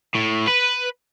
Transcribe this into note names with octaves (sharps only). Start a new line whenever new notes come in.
A2
B4